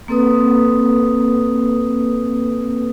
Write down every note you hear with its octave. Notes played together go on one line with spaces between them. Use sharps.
A#3 C4 A4 B4 D#6